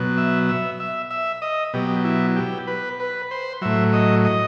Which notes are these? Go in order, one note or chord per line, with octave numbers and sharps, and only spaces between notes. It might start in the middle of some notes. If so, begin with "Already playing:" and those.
Already playing: B2 F#3
E5
E5
E5
E5
D#5
B2 F#3 G4
E4
G4
B4
B4
C5
A2 F#3 E5
D#5
D#5